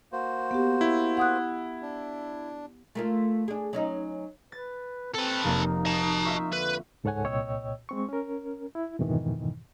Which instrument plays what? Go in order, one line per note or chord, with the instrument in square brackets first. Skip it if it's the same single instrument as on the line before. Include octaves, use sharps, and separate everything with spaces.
[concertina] A#3 F#4 C5
[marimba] B3 G4
[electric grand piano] E4
[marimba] F#5 D#6 F#6
[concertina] D4
[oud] A3 A#3 F4
D4 G#4
F#3 C#4 D#4
[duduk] B4 [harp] A6
[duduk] C4 [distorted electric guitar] A4 B4
[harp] F1 A#3 [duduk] D#4
[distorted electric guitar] D#5 A5 [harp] C#7
[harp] F4 E5 C#6
[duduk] D3 [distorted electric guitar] B4
[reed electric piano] C#2 G#2 A4 C#5 F#5 G#5
C2 A#2 C#5 D#5 G5 E6
G#3 C4 C#6
C#4 A#4
E4
F2 G#2 B2 D#3 E3